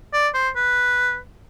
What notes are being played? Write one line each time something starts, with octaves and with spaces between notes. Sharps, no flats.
D5
C5
B4